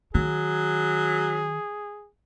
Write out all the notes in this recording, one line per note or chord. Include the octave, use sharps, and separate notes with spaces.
D#3 F#3 G#4